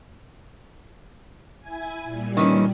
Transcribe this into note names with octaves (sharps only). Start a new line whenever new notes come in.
E4 G#5
A#2 G3
D#3 E3 C#4